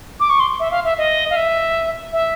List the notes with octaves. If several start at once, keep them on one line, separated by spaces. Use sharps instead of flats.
D6
C#6
C6
E5
F5
E5
D#5
F5
E5
E5